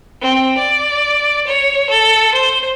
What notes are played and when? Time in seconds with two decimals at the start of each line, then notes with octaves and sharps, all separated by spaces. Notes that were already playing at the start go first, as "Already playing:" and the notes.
0.21 C4
0.58 D5
1.48 C#5
1.90 A4
2.34 C5